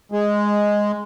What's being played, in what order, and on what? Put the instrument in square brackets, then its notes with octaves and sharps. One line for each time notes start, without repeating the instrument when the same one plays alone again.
[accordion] G#3